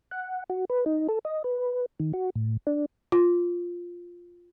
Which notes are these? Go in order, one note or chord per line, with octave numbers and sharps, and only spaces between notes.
F#5
F#4
B4
D#4
A4
D#5
B4
D#3
F#4
A2
D4
F4